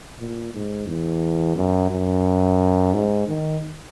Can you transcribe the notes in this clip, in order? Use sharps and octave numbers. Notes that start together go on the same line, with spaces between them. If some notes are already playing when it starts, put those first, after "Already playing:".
A#2
G#2
E2
F#2
F#2
G#2
D#3